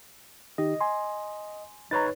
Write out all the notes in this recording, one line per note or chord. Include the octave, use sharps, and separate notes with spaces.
D#3 D#4 G4 D#5
G#5 C6
D#4 B4 C#5 A#5 A6